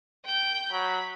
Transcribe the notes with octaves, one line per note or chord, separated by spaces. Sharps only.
G5 G6
F#3 B5